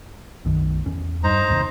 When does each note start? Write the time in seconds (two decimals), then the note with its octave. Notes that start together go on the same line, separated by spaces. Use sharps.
0.45 B1 F#2 D#3
0.86 E2 C#4
1.24 G2 D#4 C5 A#5
1.48 F#1 D#2 C3